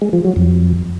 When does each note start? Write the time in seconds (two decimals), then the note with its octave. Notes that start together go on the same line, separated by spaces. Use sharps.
0.02 G#3
0.13 F3
0.25 F#3
0.36 F2